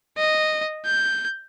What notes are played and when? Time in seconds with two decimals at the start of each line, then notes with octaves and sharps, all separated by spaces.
0.17 D#5
0.86 G6